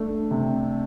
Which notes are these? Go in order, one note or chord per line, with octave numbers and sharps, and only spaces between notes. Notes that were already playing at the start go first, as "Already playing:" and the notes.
Already playing: A3 D4
C3